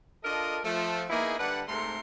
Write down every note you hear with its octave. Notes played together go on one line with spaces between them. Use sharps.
D4 F4 A4 A#4 D#5
F3 A3
A#3 B3 D#4 E4 G#4
D3 G3 D4 B4 F#5
G#2 C3 A3 A4 A#4 C6